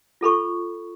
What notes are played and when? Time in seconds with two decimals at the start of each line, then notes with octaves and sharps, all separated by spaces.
0.21 F4 A4 B5 C#6